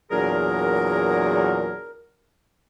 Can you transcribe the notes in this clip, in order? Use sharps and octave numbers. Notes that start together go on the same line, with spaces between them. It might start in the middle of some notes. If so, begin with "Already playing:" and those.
E2 A#2 F#3 D4 G#4 A#4